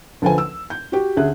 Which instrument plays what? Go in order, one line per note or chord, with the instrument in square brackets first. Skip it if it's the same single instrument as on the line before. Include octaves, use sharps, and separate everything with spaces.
[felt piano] D2 F3 A4 B4 C5 G#5
E6
G6
F#4 G4
D2 C#4 G#4 E5 F#6